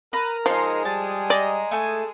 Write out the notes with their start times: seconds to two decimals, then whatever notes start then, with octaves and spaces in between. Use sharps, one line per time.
0.13 A#4 B4 A#5
0.46 F3 G#3 D#4 G#4 C6
0.85 G3 A5
1.30 D5 D#5 A#5
1.71 A3 A4 G#5